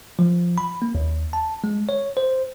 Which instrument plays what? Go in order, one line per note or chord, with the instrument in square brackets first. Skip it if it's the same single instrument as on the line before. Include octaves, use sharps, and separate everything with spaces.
[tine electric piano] F3
B5
A#3
D#2
A5
G#3
C#5
C5